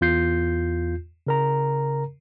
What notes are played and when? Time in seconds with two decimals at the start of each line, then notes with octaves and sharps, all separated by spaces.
0.01 E2 F4 G6 C7
1.27 C#3 A#4 A#5